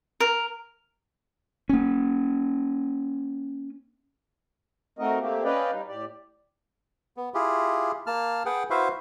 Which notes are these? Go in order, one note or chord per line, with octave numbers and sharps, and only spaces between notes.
A#4
A#3 C#4
A3 C4 D#4 F#4 A#4 D#5
A3 A#3 C4 G4
C#4 B4 D5 D#5 F5 G5
G3 D#4
A2 G4 D5
B3
E4 F4 G4 G#4
A#3 A5 F6
G#4 B4 F#5 G5
E4 F#4 B4 C5 E5 F5